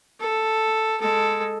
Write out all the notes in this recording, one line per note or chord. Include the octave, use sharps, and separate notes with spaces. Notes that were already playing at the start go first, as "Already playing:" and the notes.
A4
G#3 A4